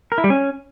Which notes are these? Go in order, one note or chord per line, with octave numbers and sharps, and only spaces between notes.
A#4
E4
G3
C#4